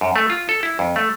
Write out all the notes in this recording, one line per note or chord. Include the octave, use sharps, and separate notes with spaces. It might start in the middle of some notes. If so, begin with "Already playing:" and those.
F#2
A3
F4
A4
E4
F2
A3